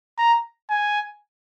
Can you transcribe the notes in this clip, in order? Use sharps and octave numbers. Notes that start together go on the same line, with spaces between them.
A#5
G#5